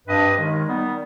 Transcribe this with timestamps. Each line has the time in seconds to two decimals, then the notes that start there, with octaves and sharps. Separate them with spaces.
0.07 G2 F3 C4 G4 B4 D#5
0.36 D#2 D#3 G#3
0.64 D#3 G3 B3